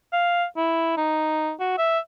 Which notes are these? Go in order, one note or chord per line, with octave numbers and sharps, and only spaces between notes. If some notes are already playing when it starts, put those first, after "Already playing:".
F5
E4
D#4
F#4
E5